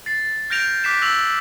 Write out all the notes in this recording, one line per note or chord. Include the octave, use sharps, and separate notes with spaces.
A6 C7
F6 G6 A#6 D7 F7
D6 F#6 B6 C7 E7
C#6 E6 A#6 F7 F#7